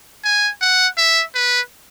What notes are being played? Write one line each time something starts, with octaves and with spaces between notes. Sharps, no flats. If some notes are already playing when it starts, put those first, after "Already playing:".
G#5
F#5
E5
B4